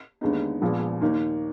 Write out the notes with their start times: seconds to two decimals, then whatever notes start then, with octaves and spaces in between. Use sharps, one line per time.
0.21 D#2 D3 G#3 B3 D#4
0.62 A#1 A#2 F3 G#3 B3
1.01 D#2 D#3 A#3 D#4